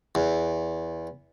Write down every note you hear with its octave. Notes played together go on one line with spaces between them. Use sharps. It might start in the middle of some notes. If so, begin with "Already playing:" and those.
E2